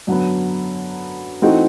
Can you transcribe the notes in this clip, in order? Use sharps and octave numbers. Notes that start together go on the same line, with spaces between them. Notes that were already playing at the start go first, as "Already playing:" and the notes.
F#2 D3 F#3 B3
E3 A3 C4 D#4 F#4